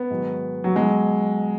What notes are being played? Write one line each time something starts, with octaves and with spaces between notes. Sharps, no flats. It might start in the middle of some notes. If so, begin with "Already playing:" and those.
Already playing: B3
G#2 D#3 F#3
F#3
B2 F#3 G#3